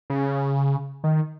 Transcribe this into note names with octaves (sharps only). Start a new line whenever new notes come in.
C#3
D#3